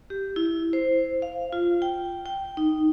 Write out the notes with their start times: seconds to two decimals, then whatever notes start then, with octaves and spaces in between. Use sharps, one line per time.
0.10 G4
0.36 E4
0.73 C5
1.22 F5
1.53 F4
1.82 G5
2.26 G5
2.57 D#4